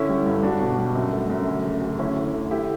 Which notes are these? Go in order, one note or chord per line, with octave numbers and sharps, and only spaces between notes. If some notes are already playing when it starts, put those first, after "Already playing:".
Already playing: D3 C#4 E4
G3
G2
G3 D4 F#4
B2
G3
F#2
A3
F#2
D2
C#3
D2
D2 C#4 E4
D2
D3
D3 E4 G4